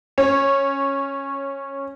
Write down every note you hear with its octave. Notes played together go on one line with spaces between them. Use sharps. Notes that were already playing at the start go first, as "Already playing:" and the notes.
C#4 C#5